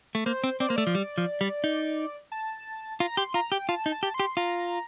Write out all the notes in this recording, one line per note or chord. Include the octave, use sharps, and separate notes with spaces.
A3
A#3 C5
C4
C4 D5
A#3 C5
A3 D5
F3
G3
F3
G3
D#4
A5
F4 A#5
G4 C6
F4 A#5
G4 G5
F4 A5
D#4
A5
G4
C6
G4
F4 A#5